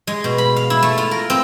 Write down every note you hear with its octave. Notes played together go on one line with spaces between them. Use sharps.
G#3
B2
B5
F5
E4
A3
F4
A#4
C4